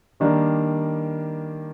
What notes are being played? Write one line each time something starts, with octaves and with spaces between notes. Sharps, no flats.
D#3 G3 A#3 D4